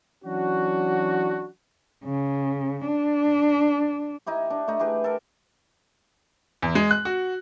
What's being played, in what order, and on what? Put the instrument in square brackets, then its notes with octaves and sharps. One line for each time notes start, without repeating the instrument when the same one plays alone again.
[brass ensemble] E3 F#3 C#4 D4 F#4
[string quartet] C#3
D4
[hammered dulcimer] D#4 E4 G4
D4
A3 D#4
E4 G4 G#4 B4
A4 A#4
[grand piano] E2
G#3
F#6
F#4